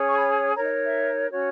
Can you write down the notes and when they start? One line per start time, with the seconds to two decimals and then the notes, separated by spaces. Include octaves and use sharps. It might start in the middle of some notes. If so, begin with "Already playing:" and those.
Already playing: C#4 G#4 C#5
0.08 C#6
0.18 B5
0.55 D#4 A#4 C#5 A#5
0.65 D#5
0.84 E5
1.31 C#4 F#4 C#5